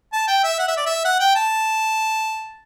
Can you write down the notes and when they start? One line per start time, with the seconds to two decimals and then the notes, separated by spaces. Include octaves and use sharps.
0.12 A5
0.28 G5
0.43 E5
0.59 F#5
0.68 E5
0.77 D5
0.86 E5
1.05 F#5
1.20 G5
1.35 A5